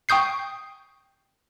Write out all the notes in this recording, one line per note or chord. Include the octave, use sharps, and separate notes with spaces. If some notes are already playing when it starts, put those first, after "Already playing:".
G5 C#6 D#6 G6 C7